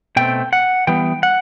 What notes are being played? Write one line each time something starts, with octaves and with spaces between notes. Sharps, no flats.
B2 A3 C4 G5
F#5
E3 G3 B3 G5
F#5